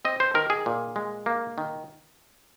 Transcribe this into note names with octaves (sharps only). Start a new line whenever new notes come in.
C4 D#5
C5
D#3 A#4
G#4
A#2
G#3
A#3
D#3